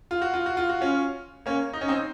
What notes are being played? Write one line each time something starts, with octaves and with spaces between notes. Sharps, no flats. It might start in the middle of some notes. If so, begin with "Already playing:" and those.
F4
F#4
F4
F#4
F4
F#4
C#4 F4
A#3 C#4
D#4
C#4
C4 D#4